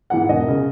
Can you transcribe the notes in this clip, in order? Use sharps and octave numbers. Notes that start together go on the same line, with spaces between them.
G#2 E3 F#5
E1 D#5
C#3